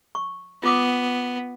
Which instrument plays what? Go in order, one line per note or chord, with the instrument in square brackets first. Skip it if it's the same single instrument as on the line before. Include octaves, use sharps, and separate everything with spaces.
[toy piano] C#6
[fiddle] B3 [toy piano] F4 D6 D#6